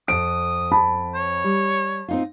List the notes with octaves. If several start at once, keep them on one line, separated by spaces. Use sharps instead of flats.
F2 D#6 D7
A5 B5
C#5
G3
C4 D#4 F4